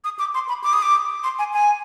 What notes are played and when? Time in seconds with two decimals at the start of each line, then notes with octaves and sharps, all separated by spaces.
0.04 D#6
0.19 D6
0.34 C6
0.49 B5
0.64 D6
0.73 D#6
0.82 D6
1.24 C6
1.39 G#5
1.53 G#5